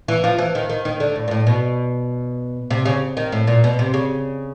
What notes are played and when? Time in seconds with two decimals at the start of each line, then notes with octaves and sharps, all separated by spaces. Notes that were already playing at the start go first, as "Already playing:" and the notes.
0.08 E3
0.24 F3
0.38 E3
0.55 D#3
0.70 D#3
0.85 D#3
1.00 D3
1.16 A2
1.28 A#2
1.31 A2
1.47 B2
2.71 C3
2.85 C#3
3.17 D#3
3.32 A2
3.47 A#2
3.64 B2
3.79 C3
3.94 C#3